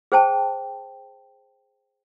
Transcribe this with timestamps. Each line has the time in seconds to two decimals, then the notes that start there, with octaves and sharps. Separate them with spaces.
0.12 G#4 C5 G5 A5